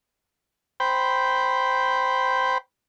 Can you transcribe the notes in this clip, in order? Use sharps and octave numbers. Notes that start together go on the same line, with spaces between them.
C5 G5 B5